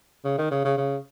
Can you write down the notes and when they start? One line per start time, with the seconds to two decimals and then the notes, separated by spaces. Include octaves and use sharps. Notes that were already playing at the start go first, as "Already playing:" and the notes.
0.25 C#3
0.38 D#3
0.51 C#3
0.65 C#3
0.78 C#3